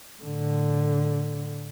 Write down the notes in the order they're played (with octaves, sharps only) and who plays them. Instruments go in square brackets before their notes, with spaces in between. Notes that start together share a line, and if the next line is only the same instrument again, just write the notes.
[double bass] A2 D3